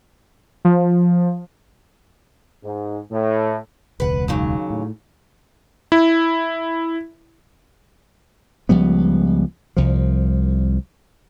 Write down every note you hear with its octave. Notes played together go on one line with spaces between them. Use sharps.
F3
G#2
A2
E1 C#2 B4 F#5
D#2 C#3 F#3
A2
E4
C#2 F3 G3 B3
C2 F3